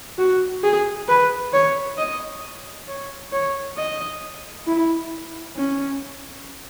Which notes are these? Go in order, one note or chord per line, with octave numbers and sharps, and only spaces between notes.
F#4
G#4
B4
C#5
D#5
C#5
C#5
D#5
E4
C#4